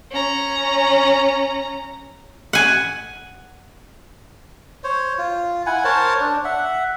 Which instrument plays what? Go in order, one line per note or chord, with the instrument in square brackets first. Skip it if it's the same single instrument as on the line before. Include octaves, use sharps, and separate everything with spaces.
[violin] C#4 A#5
[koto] F#5 G#5
[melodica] C5 C#5
F4
E4 F#5 G#5
A#4 C5 C#5 A5
D4
E5 F#5